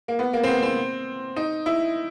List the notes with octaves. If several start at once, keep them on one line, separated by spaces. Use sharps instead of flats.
A#3
B3
A#3
C4
B3
C4
D#4
E4